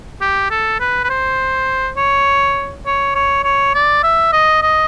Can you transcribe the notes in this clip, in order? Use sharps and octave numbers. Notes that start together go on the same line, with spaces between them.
G4
A4
B4
B4
C5
C#5
C#5
C#5
C#5
D5
E5
D#5
D#5